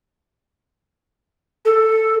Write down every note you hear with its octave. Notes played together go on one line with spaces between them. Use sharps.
A4